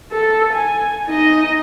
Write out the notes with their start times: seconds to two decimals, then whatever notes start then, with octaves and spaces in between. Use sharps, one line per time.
0.12 A4
0.53 G#5
1.06 D#4 D#5